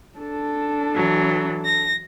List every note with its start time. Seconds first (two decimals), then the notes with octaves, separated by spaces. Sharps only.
0.18 D4 A4
0.96 E3 F#3
1.64 A#6